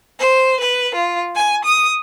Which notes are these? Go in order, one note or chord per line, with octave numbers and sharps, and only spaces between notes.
C5
B4
F4
G#5
D#6